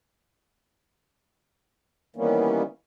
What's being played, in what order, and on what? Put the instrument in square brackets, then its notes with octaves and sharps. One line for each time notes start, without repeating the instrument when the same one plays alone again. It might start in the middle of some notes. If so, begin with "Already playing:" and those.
[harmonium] D#3 E3 G3 A#3 B3 C#4